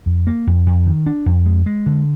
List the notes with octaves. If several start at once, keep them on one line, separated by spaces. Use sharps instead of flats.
F2
A#3
F2
F2
D#3
D4
F2
G#3
G#3
D3